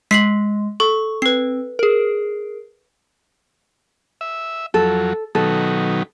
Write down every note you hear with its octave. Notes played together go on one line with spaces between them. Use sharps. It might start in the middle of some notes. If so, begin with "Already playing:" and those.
G#3 B6 C7 F#7
A4 C#6
C4 B4 C7
G#4 A#4
E5
F2 F#3 A4
B2 D#3 F#3 A4